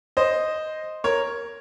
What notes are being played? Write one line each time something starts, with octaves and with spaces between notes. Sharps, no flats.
C5 D#5
A#4 C#5